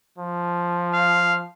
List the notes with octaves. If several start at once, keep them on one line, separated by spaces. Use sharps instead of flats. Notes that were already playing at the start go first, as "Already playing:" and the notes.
F3
F5